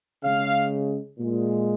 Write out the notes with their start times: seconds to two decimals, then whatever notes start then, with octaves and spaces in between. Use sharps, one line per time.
0.23 C#3 G#3 F5
1.18 A#2 G#3